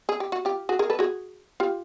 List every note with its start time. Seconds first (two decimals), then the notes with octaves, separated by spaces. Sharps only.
0.09 G#4
0.20 G4
0.32 F#4
0.45 F4 G4
0.69 F#4 G#4
0.79 G#4 A#4
0.90 A4 B4
0.99 F#4 G#4
1.60 F4 G4